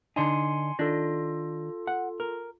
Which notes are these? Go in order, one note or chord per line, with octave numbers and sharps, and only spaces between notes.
D3 D4 D#4 G#5 C6 C#7
D#3 D4 F4 A4
F#5
A#4